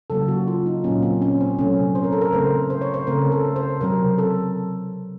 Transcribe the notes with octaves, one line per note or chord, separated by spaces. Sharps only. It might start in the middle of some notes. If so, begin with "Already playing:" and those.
C#3 F#3 A#3 A4
F#4
F4
D#4
A#2 F#3 A#3 C#4
C4
C#4
C4
C3 F#3 A3 C#4
C5
A#4
A4
A#4
C#3 A3 C4 C5
C5
C#5
C5
C#3 A3 C4 A#4
A4
C5
C3 F#3 C4 A#4
A4